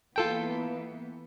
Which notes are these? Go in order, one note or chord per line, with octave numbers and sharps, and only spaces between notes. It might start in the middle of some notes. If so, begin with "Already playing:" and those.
E3 A#3 B3 F4 A4 G5